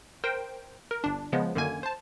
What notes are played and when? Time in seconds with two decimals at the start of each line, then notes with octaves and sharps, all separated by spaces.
0.24 A#4 C5 G5
0.91 A#4
1.04 G1 D4
1.32 C#3 F3 G#3 B3
1.55 F#2 D3 D#3 A#3 G#5 G#6
1.83 C5 A5